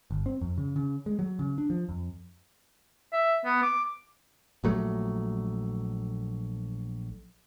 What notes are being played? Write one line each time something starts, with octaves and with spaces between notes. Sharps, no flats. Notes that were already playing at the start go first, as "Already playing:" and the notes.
G1
C4
F2
C#3
C#3
G#3
F#3
C#3
D4
F3
F2
E5
B3
D6
A#1 F#3 A3